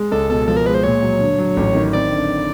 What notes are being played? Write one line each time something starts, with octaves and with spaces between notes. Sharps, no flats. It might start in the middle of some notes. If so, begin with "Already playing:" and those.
Already playing: G#3
C#2 A4
B2 A4
F3 A4
A#4
G#3 B4
C5
A#2 C#5
F#3
D3
F#3
A1
D#3
C4 D5
D3